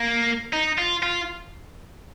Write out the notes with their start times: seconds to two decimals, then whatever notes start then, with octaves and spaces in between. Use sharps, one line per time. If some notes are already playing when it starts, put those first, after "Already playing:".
Already playing: A#3
0.53 D#4
0.78 F4
1.03 F4